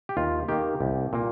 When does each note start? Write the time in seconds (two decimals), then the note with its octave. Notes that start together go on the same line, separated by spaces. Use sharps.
0.09 G4
0.17 D#2 F4
0.48 D#3 A#3 G4
0.81 C2
1.13 A#2 A#3